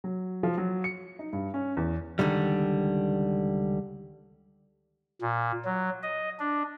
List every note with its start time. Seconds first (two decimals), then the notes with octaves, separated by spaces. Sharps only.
0.04 F#3
0.43 F3
0.58 F#3
0.84 C#7
1.19 D#4
1.33 G2
1.54 C#4
1.77 E2
2.19 C#2 A2 D3 D#3 G3
5.21 A#2
5.65 F#3
6.03 D#5
6.39 D4